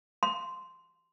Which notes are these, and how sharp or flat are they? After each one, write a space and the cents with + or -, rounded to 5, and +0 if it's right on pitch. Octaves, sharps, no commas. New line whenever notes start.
C6 -10